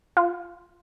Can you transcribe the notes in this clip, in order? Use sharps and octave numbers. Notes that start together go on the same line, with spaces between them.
F4